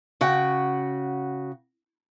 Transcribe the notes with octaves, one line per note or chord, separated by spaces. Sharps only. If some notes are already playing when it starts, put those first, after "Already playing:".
C#3 F#4 F#5 G5